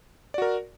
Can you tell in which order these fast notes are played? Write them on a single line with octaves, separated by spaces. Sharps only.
D5 F#4 A#4